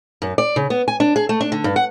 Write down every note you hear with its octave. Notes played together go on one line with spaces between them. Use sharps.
F#2
D5
C#3
B3
G#5
D4
G#4
A3
D4
D3
G2
F#5